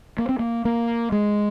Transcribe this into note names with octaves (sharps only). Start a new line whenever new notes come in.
A#3
C4
A#3
A#3
G#3